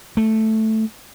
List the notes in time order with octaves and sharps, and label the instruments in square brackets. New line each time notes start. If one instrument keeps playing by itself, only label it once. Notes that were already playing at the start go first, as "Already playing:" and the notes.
[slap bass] A3